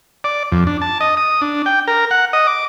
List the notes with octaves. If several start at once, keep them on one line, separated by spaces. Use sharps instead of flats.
D5
F2
D4
A5
D#5
D#6
D4
G5
A#4
F#5
D#5
D6